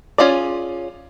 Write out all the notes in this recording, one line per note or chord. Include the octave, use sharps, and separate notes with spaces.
C#4 F4 G#4 D5